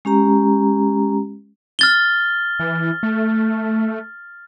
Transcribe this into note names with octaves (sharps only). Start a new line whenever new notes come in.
G#3 C#4 G4 A#5
F6 A6 G7
E3
A3